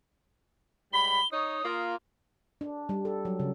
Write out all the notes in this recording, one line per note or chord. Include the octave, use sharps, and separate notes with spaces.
G#2 G3 B5 G7
D#4 C#5 D#6
A#3 F4
D4
G3
A4
F#3
C#3